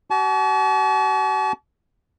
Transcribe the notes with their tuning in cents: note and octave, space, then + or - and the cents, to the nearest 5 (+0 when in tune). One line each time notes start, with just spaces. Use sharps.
F#4 +45 A5 -40